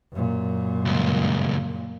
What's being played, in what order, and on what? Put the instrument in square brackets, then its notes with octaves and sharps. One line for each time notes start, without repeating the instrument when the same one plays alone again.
[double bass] F#2 A#2
[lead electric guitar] C#2 G2